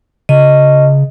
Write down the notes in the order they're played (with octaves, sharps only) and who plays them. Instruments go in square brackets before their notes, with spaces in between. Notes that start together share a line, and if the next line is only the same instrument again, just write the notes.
[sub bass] C#3 [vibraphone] D#5